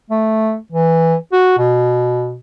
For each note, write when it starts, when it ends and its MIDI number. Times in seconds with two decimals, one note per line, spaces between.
0.11 0.56 57
0.72 1.15 52
1.33 1.54 66
1.58 2.37 47